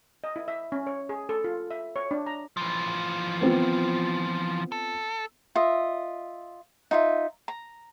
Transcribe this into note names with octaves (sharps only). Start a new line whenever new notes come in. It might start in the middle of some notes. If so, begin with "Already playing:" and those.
D#5
E4
E5
C#4
C#5
G#4
A4
F4
E5
C#5
D4
A#5
E3 F3
B3 C4 F4
A4
F4 D#5 E5
D#4 F4 E5
A#5